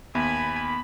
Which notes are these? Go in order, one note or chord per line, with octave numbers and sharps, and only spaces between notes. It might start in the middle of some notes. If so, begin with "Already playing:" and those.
D#2 B3 G#5 B5